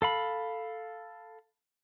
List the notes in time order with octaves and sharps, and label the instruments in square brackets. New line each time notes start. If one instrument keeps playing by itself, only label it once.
[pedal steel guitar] A4 F5 B5